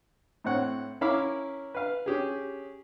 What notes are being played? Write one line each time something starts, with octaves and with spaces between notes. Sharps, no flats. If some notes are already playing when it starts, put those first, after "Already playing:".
A2 C4 C#5 F#5
C#4 E4 A#4 F5 B5 D6
B4 F5
C#4 G4 G#4